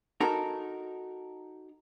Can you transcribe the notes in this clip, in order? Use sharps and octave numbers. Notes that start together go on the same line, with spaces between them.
D#4 F#4 A4 A#4